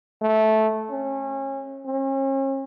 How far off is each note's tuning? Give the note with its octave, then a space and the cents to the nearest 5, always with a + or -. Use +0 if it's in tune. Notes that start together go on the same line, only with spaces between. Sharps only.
A3 -10
C#4 -30
C#4 -40